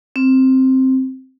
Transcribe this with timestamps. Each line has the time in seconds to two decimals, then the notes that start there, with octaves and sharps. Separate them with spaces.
0.16 C4